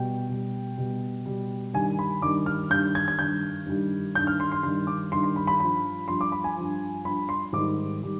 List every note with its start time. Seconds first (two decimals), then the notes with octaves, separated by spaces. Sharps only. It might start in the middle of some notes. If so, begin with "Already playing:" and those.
Already playing: B2 G3 G5
0.29 B2 G3
0.78 B2 G3
1.26 B2 G3
1.73 G2 D#3 G3 G#5
1.99 B5
2.22 G2 D#3 G3 D6
2.46 F6
2.70 G2 D#3 G3 G6
2.95 G#6
3.08 G#6
3.19 G2 D#3 G3 G6
3.66 G2 D#3 G3
4.15 G2 D#3 G3 G6
4.27 F6
4.40 C6
4.52 C6
4.63 G2 D#3 G3 C6
4.87 D6
5.12 G2 D#3 G3 C6
5.23 C6
5.36 B5
5.47 B5
5.60 G2 F3 B5
6.08 G2 F3 C6
6.21 D6
6.32 B5
6.44 G#5
6.56 G2 F3
7.05 G2 F3 B5
7.29 C6
7.53 G#2 D#3 G3 D6
8.02 D#3 G3